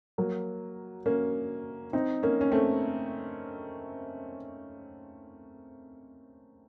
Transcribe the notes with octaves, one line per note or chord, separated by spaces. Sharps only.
F#3 A#3
A#3 C#4
C4 D#4
A#3 C#4
C#4
A3 C4